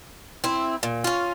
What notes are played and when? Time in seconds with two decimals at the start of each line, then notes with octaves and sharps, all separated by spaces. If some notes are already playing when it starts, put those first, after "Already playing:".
0.44 C4 E4
0.83 A#2
1.04 C#4 F4